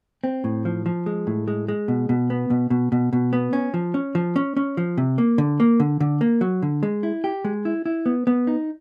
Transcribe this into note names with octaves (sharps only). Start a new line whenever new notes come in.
C4
A2
F3
F3
G#3
A2
G#3
G#3
B2
B2
B3
B2
B2
B2
B2
B3
C#4
F3
C#4
F3
C#4
C#4
F3
C3
A#3
D3
A#3
D3
D3
A#3
F#3
D3
G#3
E4
G4
G#3
E4
E4
B3
B3
D#4